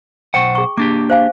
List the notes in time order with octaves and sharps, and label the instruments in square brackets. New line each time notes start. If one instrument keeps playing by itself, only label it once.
[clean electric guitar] B1 C5 F#5 [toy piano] G5 C#6
[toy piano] G#4 C#6
[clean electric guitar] A#3 D4 G4 [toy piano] D6
[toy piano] C5 F5 G#5